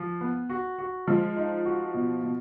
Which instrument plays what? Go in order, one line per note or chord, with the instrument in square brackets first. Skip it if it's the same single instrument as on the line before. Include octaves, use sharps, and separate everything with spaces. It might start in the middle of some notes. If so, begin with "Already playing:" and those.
Already playing: [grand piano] F3
B3
F#4
F#4
[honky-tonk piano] F3 [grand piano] G#3
[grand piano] D#4
F#4
B2
B2